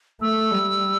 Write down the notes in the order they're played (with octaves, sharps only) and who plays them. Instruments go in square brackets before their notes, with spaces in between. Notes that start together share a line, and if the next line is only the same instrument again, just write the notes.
[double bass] A3 [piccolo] E6
[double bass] G3